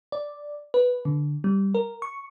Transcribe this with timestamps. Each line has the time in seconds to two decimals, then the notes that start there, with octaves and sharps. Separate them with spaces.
0.12 D5
0.74 B4
1.05 D3
1.44 G3
1.75 A#4
2.02 C#6